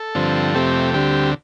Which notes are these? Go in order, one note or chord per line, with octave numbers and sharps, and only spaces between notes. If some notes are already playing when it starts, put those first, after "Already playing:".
Already playing: A4
G2 D3 F3 C4
F2 C3 A3 C4 G4
D2 D3 G3 C4